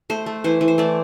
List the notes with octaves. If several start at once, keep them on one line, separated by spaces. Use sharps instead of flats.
A3 C5
A3
E3 C5
E3
C5
A3 D5